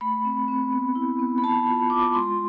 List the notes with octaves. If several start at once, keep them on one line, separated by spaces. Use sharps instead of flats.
A3 B5
C4
C4
B3
E4
B3
B5
B3 A5
F4 B5
F4 D6
G#3 C6